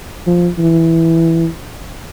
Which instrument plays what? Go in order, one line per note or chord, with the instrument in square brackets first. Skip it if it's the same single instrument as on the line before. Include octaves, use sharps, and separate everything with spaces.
[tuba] F3
E3